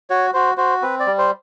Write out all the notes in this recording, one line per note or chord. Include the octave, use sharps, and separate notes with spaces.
F#4 C#5
F#4 C5
F#4 C5
C4 B4
D5
G3
C5